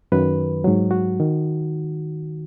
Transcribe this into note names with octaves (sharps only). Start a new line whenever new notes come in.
F#2 D#3 F#3 B4
G#2 F#3
F#4
D#3